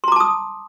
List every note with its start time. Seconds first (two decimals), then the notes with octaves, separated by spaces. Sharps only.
0.04 C6
0.08 A#5
0.12 D6
0.16 A5
0.20 D#6